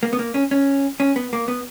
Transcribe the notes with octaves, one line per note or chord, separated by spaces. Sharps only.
A#3
B3
A#3
C#4
C#4
C#4
B3
A#3
B3